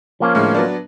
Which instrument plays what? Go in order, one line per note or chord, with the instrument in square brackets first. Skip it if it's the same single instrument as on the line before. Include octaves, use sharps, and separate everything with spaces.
[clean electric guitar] F3 A#3 C#4
[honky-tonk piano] A2 D3 G#3
F#3 B3 D4